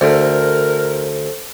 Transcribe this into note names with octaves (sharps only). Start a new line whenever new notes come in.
D2 A4 A#4 C5